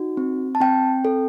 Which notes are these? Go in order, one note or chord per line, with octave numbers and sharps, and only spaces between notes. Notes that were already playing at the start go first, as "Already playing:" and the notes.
Already playing: D#4 F#4
C4
A5
C4 G5
A4